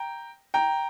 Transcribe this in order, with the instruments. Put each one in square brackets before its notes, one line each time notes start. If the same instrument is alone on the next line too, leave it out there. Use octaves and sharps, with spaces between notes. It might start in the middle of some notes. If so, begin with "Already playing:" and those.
Already playing: [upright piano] G5 A#5
G5 A#5